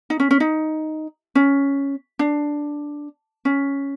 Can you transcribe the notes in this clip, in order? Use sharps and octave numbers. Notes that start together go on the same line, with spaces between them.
D#4
C#4
C#4
D#4
C#4
D4
C#4